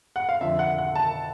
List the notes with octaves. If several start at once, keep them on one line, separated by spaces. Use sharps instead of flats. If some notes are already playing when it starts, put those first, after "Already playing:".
F#5
F5
F2 D3 F3 E5
F#5
F#5
A5